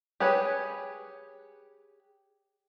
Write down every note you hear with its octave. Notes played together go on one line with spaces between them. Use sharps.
G4 G#4 B4 C#5